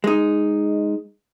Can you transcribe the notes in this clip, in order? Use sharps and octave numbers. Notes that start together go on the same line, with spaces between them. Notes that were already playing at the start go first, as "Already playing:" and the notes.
G#3 D#4